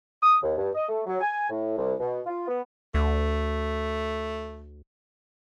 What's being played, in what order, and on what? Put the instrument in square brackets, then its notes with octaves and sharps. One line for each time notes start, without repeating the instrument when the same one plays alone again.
[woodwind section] D#6
D#2
G2
D#5
A3
F#3
G#5
A2
C2
B2
F4
B3
[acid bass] D2 [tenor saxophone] A3